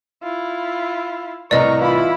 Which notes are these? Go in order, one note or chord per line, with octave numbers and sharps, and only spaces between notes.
E4 F4
C2 A2 B3 A#4 D5 D#5 A#5 C#6
E3 E4 F4 B5